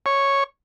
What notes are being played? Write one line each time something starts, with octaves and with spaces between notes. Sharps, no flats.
C#5